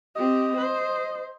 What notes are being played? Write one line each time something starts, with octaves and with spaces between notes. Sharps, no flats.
C4 G4 D#5
C5